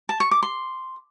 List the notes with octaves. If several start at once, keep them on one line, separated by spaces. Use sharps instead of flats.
A5
C#6
D6
C6